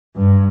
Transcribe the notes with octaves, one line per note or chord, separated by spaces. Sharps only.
G2